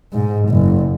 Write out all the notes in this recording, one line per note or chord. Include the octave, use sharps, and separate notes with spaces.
G#2
F#1